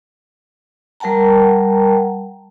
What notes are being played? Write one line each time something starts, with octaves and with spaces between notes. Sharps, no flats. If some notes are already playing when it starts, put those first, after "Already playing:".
G3 A#4 F#5 G5 A5 A#5